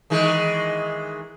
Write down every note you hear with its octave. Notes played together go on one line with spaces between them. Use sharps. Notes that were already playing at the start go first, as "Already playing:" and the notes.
D#3 E3 G#3